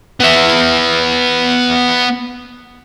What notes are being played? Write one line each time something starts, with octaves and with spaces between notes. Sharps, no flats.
B3 E5